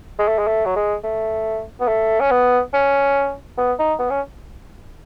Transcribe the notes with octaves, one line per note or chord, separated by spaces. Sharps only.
G#3
A3
G#3
A3
F#3
G#3
A3
B3
A3
C#4
B3
C#4
B3
D#4
B3
C#4